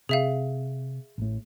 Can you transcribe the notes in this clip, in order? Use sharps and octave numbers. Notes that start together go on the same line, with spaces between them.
C3 G#4 E5 F5
A1 A2